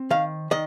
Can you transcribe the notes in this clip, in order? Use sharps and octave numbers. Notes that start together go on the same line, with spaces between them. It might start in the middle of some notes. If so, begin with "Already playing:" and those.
Already playing: C4
D#3 F5
D#3 D#5